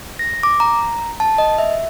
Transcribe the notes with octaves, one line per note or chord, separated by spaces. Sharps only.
A#6
D6
A#5
A5
D#5
E5